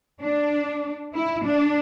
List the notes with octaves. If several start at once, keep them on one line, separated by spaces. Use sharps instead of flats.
D4
E4
D4